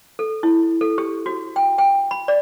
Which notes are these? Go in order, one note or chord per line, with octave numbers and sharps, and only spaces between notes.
A4
E4
A4
G4
F#4
G5
G5
B5
D5